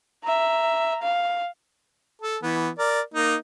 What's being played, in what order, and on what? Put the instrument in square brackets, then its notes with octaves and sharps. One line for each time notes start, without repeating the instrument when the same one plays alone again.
[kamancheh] E5 A#5
F5
[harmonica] A4
E3 B3
A#4 D5
A#3 D#4